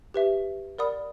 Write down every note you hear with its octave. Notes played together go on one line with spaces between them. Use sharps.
G4 B4 E5
A#4 D5 F#5 B5 D#6